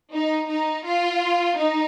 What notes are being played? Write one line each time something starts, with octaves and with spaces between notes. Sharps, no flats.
D#4
D#4
F4
D#4